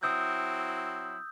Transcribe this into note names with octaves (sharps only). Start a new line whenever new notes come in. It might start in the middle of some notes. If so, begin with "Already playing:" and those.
F#3 C4 E4 D#6 E6 G6